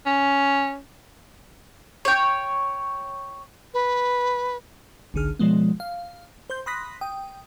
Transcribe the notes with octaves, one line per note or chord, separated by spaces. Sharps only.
C#4
C#5 G5
B4
G#1 C#2 D3 G#4 F6
B2 F3 G#3 B3
F5
C5 C6 G6
B5 C6 D#6 F#6 A#6 B6
G5 D#6